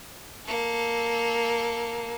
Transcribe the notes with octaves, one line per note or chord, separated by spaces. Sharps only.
A#3 A4